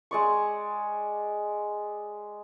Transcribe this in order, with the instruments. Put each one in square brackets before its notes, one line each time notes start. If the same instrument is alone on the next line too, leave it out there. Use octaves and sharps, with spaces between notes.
[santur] G#3 D5 C#6